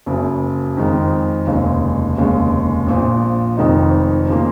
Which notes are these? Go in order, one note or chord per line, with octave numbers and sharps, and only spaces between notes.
F#1 F#2 C#3
F2 D#3 G#3
F1 D#2 C#3 G#3
F1 D#2 C#3 G#3
A#1 A#2 F3
F1 F2 D#3 G#3 D#4
C#3 F3 A#3